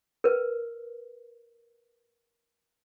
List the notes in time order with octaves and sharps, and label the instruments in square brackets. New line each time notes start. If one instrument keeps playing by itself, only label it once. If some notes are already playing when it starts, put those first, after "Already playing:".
[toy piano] A#4 B4